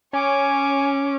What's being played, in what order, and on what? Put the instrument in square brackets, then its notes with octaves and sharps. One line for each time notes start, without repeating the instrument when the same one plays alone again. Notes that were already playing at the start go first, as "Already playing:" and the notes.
[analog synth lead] C#4 [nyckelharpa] C#5 D6 [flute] G#5